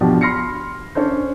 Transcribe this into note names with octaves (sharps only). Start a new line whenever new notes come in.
B2 F3 D4 F#4 G4
B5 C6 F6 A#6 C7 C#7
C#4 D4 A4 C5